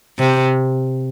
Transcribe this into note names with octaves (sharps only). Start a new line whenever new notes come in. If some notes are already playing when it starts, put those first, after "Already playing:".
C3